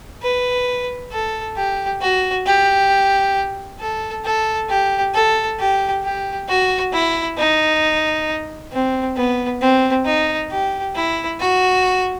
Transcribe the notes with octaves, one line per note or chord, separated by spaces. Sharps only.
B4
A4
G4
F#4
G4
A4
A4
G4
A4
G4
G4
F#4
E4
D#4
C4
B3
C4
D#4
G4
E4
F#4